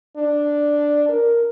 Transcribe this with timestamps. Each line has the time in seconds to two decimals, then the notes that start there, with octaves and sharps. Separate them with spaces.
0.17 D4
1.09 A#4